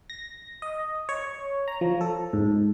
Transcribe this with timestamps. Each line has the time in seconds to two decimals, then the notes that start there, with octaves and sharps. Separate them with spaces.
0.10 A#6
0.62 D#5
1.09 C#5
1.68 A#5
1.81 F3
2.01 A4
2.33 G#2